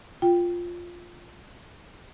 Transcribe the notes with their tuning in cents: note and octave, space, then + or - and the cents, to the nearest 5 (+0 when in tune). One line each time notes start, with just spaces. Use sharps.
F4 +0 G5 +0